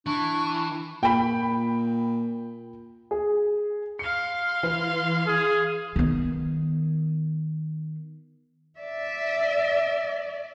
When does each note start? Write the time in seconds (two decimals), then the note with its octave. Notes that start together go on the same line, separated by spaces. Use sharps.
0.06 E3 D4 C#6
1.03 A#2 G5 B5
3.11 G#4
3.99 F5 C6 C#7
4.63 E3 B4
5.27 G#4
5.96 D#3 B3
8.79 D5 E5